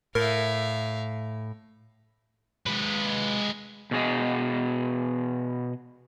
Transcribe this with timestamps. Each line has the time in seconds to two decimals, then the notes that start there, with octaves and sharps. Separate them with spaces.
0.15 A2 A#4 E5 F5
2.66 G#3 B4
3.91 B2 G#4 D#5